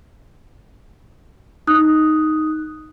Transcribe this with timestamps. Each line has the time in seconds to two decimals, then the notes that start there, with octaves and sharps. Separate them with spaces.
1.67 D#4 D#6 F#6